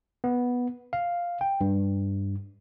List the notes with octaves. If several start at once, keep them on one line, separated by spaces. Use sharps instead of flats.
B3
F5
G5
G2